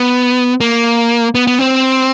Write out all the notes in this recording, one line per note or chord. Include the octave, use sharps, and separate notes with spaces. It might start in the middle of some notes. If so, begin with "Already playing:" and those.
Already playing: B3
A#3
B3
B3
C4